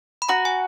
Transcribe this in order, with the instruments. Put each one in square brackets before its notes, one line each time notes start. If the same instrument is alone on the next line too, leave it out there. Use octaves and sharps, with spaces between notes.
[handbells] B5
[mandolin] F#4 [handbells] A#5
[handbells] G#5